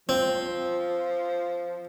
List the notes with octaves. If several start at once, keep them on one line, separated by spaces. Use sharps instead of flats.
F3 C4